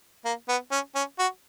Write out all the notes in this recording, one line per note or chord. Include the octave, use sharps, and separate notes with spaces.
A#3
B3
C#4
C#4
F#4